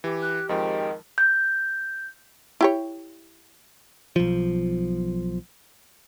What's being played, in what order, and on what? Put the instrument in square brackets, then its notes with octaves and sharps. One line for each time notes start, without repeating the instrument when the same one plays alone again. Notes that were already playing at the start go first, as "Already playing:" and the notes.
[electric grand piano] E3 [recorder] G4
[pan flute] F#6
[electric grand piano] F2 F3 G#3 [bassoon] D#3 [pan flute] G5
[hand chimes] G6
[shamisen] E4 G4 C#5
[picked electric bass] B1 F3